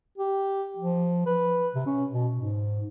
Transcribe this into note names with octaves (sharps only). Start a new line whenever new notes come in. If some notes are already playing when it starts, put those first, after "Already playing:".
G4
F3
B4
C3
C#4
B2
G#2